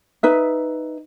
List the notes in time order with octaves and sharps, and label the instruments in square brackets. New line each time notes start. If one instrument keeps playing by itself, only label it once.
[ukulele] D#4 B4 E5